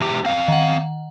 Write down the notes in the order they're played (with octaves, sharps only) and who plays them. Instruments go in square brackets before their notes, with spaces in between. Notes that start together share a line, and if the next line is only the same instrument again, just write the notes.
[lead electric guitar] E2 G4
C4 F5
[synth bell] D#3 F#5